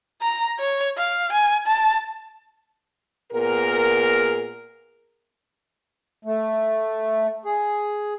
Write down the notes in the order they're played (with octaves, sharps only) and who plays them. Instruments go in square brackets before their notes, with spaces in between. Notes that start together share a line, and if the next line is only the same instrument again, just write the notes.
[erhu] A#5
C#5
F5
G#5
A5
[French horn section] A#2 B3 G#4 A#4
[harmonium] A3
G#4